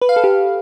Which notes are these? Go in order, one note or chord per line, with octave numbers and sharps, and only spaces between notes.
B4
F5
A4
G4